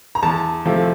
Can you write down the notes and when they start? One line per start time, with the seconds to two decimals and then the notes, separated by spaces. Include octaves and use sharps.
0.15 A#5
0.23 E2 A5
0.65 C3 F3 A3 C4